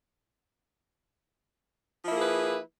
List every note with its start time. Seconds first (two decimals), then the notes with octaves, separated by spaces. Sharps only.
2.03 F3
2.07 E4
2.11 A#3
2.15 G#4
2.19 B4